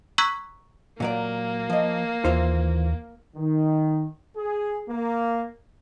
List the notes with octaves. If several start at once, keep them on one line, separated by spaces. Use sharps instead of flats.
A#5 C#6 E6 F#6 G#6 B6
A#2 F#3 A#3 D5
F3 D#5
D#2 E3 F4 C5
D#3
G#4
A#3